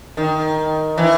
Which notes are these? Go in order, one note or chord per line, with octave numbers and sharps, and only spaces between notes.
D#3
E3